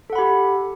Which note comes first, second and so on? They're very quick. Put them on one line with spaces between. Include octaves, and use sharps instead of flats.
A4 F#5 B5 G4